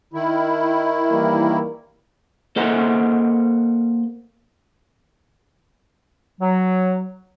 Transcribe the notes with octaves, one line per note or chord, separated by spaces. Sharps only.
D#3 E4
E3 G3 A#3
A#3 A4 C5 D#5 F#5
F#3